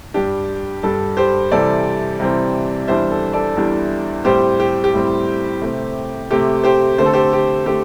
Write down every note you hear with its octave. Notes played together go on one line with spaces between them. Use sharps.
G2 G3 D4 G4
G2 G3 D4 A4
G4 C5
C3 E3 G3 C4 A4 D5
C3 E3 G3 C4
E2 E3 G3 D4 C5 E5
A4
A4 D5
E2 E3 G3 D4
A2 G3 C4 G4 C5
G4
G4
A2 G3 C4
C3 A3 C4
C3 A3 C4 G4
G4 C5
D3 A3 C4 C5
A4
G4 C5
G4
D3 A3 G4